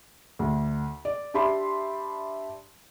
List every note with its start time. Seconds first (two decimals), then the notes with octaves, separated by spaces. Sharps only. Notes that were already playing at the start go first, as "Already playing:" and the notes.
0.39 D2
1.05 D5
1.34 D4 G4 E5 B5 C6